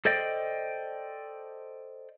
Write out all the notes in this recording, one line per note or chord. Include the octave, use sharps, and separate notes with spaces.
A4 C5 D5 D#5 G5